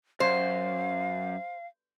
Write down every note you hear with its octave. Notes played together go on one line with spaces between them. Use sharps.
F#2 C5 F5